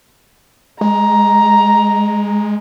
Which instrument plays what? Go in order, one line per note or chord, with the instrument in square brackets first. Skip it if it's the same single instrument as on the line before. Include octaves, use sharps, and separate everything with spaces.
[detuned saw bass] G#3 [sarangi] A#5